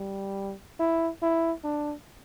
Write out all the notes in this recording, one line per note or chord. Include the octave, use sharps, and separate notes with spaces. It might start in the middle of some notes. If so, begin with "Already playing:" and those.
Already playing: G3
E4
E4
D4